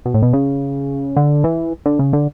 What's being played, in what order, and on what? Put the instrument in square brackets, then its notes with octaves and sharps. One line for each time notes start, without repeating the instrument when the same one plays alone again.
[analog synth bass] B2
A2
B2
C#3
D3
E3
D3
C#3
D3